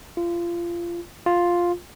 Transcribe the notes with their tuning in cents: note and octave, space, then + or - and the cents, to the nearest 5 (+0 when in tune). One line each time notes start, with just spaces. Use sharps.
F4 -25
F4 +5